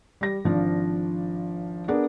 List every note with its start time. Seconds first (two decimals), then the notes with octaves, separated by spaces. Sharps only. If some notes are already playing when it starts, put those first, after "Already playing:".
0.21 G3 A#6
0.44 G#1 F3 D4 F5
1.88 B3 D4 G#4 A#4